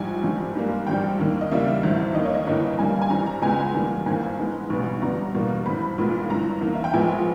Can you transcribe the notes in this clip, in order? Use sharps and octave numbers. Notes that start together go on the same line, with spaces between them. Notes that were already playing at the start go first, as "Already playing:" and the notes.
Already playing: A#1 G#2 G3 G#5
G#1 G2 D#3 G3
G#2 G3 A#3
G#1 G2 G3 G5
D#2 D#3 A#3
D#5
E2 C#3 G3 A#3 E5
G#1 G2 E3
D#2 D#3 A#3 D#5
C#5
D#5
G1 G2 E3 A#3
G2 G3 A#3 G#5
G#5
G#1 G2 E3 G3 A#5
A#5
C#2 C#3 G#3 B3 G#5
E2 D#3 G3 A#3
G#1 G2 E3 A#3 G#5
G#2 E3 G#3 B3
B1 B2 G3 B3
G1 G2 G3 B3 A#5
E2 B2 G3 A#3
G#1 G2 E3 B5
B1 A#2 G#3 B3
G1 G2 E3 A#5
E2 D#3 A#3
E5
G5
A#1 A#2 G#3 B3 G#5